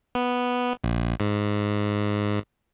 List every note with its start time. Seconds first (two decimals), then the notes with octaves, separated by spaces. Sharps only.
0.15 B3
0.84 A#1
1.20 G#2